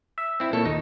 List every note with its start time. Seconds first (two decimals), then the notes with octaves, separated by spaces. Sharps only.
0.18 E5
0.40 C4 E4
0.53 A#2 A4 C#5
0.65 D#2 D#4